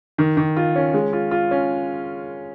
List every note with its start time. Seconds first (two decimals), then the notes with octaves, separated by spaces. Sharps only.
0.18 D#3
0.37 D#3
0.57 F4
0.76 C#4
0.94 G#3
1.13 F4
1.31 F4
1.51 C#4